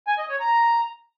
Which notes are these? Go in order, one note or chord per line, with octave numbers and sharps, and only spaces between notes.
G#5
D#5
C#5
A#5